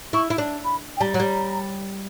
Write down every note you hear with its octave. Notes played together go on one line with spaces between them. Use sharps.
E4 C#6
E4
D4
B5
G5
G3 A#5
F#3
G3